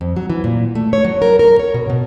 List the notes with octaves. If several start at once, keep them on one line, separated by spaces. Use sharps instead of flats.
F2
F#3
E3
A#2
A3
C#5
F#3
A#4
A#4
C#5
B2
B2